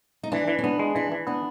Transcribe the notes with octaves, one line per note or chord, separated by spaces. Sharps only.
D#4
E3 D4
E3
C#4
B3 D4
G#3
E3 D4
E3
B3 D4